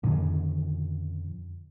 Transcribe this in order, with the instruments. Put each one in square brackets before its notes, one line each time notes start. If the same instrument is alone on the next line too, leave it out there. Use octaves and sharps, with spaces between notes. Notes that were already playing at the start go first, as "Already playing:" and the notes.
[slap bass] F2 C#4 [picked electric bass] A#2 D3 D#3